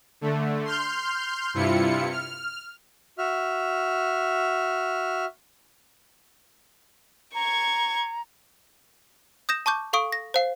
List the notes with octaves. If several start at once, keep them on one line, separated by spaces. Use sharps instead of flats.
D3 A3
C6 F6 G6
G2 C3 E4 F4 C#7
F6
F#4 E5 F6
A#5 C#6 G#6
D#6 G6 A#6 E7
A5 C#6 D6 G6
A4 F5 C#6 D#6 D7
A#6
C5 F5 C7